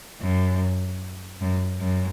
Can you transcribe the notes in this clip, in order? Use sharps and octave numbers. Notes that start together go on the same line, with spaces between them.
F#2
F#2
F#2